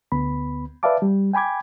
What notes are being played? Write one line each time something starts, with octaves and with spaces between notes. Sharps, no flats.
D2 B3 B5
B4 D5 E5 F5 A5 D6
G3
G5 G#5 B5 D6 G#6